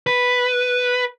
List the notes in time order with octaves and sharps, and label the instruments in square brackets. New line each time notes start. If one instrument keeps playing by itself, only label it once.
[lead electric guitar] B4